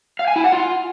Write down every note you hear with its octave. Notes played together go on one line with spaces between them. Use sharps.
F5
G#5
E4
F#5
F4